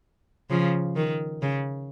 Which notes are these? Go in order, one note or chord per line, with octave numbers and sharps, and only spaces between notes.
C#3 F3
D#3
C#3